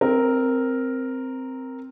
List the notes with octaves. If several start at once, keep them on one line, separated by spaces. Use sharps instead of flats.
C4 A#4